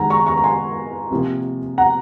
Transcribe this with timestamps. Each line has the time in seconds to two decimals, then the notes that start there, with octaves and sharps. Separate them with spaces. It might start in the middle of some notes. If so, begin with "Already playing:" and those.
Already playing: F#2 D#3 G#3 F#5 G#5 A#5
0.10 A#5 C#6
0.27 A#5 C#6
0.38 A#5
0.44 G#5 C6
1.11 C3 F3 A#3
1.78 F#5 A#5